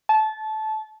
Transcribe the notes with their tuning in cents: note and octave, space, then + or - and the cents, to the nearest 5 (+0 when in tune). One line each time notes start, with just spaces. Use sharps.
A5 -20